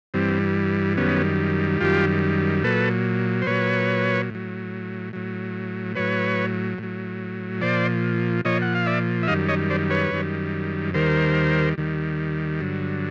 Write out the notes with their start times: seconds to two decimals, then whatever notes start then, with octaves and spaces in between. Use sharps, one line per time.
0.14 G2 E3 G3 C4
0.97 F#2 D#3 G3 B3 C#4
1.81 F#2 D#3 G3 F4 G4
2.63 A#2 F#3 A4 B4
3.42 C5
3.47 A#2 F#3 B4 C#5
4.30 A2 F#3
5.13 A2 F#3
5.95 A2 F#3 B4 C#5
6.78 A2 F#3
7.61 A#2 F3 C5 D5
8.45 A#2 F3 C#5 D#5
8.62 F#5
8.75 F5
8.86 D5 E5
9.23 E5
9.28 F#2 D#3 G3 D#5 F5
9.48 C#5 D#5
9.70 C5 D5
9.90 B4 C#5
10.11 F#2 D#3 G3
10.94 D#2 D#3 G3 A#4 C5
11.78 D#2 D#3 G3
12.60 G2 D3 F#3